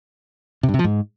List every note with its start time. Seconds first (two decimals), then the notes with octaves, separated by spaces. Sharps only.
0.63 C3
0.69 G2
0.74 C3
0.79 F3
0.84 G#2